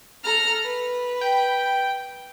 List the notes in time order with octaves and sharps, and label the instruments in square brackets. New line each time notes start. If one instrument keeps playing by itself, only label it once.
[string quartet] A4 A#5 F6
B4
[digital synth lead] G5